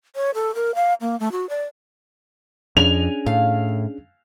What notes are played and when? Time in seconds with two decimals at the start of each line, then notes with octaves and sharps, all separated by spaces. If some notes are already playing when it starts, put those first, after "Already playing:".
0.15 C#5
0.34 A4
0.55 A#4
0.75 F5
1.01 A#3
1.20 A3
1.32 F#4
1.49 D5
2.77 F2 C#4 D4 G#4 G#5 F7
3.26 A2 F5